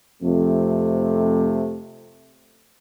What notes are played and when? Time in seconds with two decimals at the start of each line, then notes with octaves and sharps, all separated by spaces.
0.22 F2 C3 A3